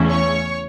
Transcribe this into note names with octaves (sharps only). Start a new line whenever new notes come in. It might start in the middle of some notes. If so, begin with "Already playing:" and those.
Already playing: E2 C#3 E3 A3 C#4
C#5 C#6